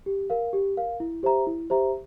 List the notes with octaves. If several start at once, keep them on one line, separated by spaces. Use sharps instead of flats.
G4
A#4 F5
G4
A#4 F5
E4
G4 C5 E5 A#5
E4
G4 C5 E5 A#5